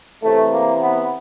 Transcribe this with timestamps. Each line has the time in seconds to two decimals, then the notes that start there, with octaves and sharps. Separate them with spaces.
0.22 C3 E3 A3
0.52 A#3
0.81 B3